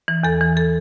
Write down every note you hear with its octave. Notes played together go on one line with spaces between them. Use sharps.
E3
E2 A4
E3
A4